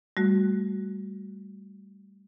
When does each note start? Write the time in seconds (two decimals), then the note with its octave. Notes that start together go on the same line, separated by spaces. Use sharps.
0.17 G3 A3 F#4